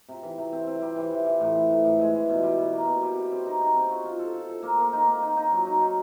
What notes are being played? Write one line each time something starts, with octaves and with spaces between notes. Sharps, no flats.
C3
E3
C3
C4
C4
G3
E3
E3
E3
A2
E3
A2
A2
G#3
E3
B2
G3
B2
A#3
B2
G3
C4
C4
D#4
D#4
C4
F#4
F4
A4
F4
A4
A#3
A#3
D#4
A#3
D#4
D#4
F#3
D#4
D#4